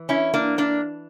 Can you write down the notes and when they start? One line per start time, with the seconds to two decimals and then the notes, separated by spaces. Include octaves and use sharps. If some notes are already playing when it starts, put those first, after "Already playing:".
Already playing: E3
0.09 C#4 E4
0.34 A#3 D4
0.58 A#3 D4